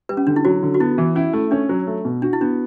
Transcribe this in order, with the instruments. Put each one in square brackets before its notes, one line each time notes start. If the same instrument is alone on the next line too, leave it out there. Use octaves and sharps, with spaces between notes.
[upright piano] G3 [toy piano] B4
[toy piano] C#4
[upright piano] D3 [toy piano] D4
[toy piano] E4
[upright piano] F#3 [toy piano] F#4
[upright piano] D3
[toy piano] F#4
[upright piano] B3 [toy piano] E4
[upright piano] E3
[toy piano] C#4 [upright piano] E4
[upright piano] A3
[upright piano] C#4 [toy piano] D4
[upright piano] F#3
A3
B2
[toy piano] D4 [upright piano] F#4
[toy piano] E4
[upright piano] B3 [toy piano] D4